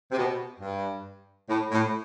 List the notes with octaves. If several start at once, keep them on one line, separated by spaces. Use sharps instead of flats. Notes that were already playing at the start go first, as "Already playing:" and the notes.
C3
B2
G2
A2
A2